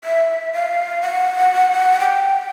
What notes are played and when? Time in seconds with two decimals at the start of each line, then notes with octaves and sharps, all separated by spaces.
0.04 E5
0.53 F5
1.02 F#5
2.00 G5